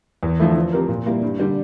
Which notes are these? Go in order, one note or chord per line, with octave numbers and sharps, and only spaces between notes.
E2
D3 F3 A3 E4
F3
C4 G4 A#4
A#2
G3 A#3 E4
G2
D3 G3 D4